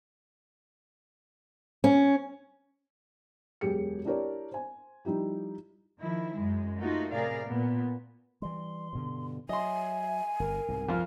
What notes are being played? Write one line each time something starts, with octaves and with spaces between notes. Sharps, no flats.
C#4
E1 F#2 G4 G#4 C#7
D4 E4 G4 A#4 C#5 D5
C5 G#5
F3 G3 D#4 E4 G4
D#3 F3 E4
F#2 G#3
A3 A#3 D#4 F4 F#4
A2 C3 G#4 A#4 D5 F5
A#2 B3
E3 G3 C6
G2 B2 D3
F#3 D#5 E5 G#5 C6
G1 G2 A#4
C2 G#2 B2
F2 F4